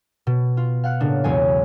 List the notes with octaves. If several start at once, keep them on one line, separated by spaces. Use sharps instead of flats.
B2
F4
F5 F#5 F#6
A2 C#3 A#3 D4
B1 E2 G#3 C#5 G#5 C7